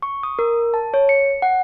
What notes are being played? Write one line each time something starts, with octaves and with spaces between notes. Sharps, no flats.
C#6
D#6
A#4
A5
C#5
C#7
F#5